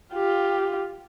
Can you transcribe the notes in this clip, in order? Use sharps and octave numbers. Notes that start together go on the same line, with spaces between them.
F4 G4